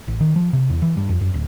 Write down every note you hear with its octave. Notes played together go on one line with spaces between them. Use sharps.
A1
D#3
F3
C3
E2
E3
G2
F2
F#2
D1